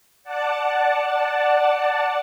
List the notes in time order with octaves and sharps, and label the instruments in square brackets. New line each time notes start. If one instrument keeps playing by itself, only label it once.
[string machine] D5 F#5 A5